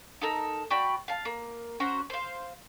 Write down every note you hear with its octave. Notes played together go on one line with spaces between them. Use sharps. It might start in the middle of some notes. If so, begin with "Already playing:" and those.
D#4 A4 A#4
F#4 D5 G5 B5
F5 A5
A#3
C#4 F#4 C5 A#5
C5 F5